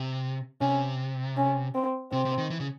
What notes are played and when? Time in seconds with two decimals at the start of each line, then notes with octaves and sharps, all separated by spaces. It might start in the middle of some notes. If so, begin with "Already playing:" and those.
Already playing: C3
0.61 C3 C#4
1.37 C#4
1.75 C4
2.12 C3 C4
2.25 C3
2.38 D#3
2.50 E3
2.60 C#3